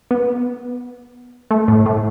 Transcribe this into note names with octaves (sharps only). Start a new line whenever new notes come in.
B3
A3
A2
A2